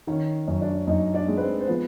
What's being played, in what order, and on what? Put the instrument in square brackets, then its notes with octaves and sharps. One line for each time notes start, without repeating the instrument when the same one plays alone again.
[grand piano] D#3 [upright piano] C#4 C#5
[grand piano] F#2
[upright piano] D4 D5
[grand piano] F#2 [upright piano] D#4 D#5
[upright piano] D4 D5
[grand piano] G#3
[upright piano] B4
C4 C5
C5
[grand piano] F3 [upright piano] B3 B4